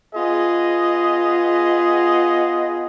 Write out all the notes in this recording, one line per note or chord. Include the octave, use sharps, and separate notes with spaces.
B3 F4 G#4 D#5